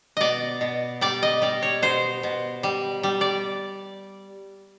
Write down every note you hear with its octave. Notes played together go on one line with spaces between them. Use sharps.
B2 D5 D#5
B2
G3 D5
D#5
G3 D5
C#5
B2 C5
B2
G3
G3
D5